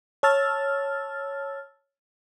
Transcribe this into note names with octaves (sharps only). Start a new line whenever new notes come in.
C#5 A5 E6 F6 A6